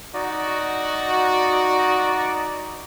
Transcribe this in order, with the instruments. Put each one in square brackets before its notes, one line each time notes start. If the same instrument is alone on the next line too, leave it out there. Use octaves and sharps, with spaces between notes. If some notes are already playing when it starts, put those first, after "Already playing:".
[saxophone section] D#4 D5 [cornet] F#4